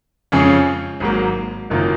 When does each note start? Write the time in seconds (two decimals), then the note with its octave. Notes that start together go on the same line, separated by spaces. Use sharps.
0.32 F2 C#3 G#3 C#4 G#4
1.00 G#1 G#2 F#3 A#3
1.70 F#1 F#2 D#3 A#3 F4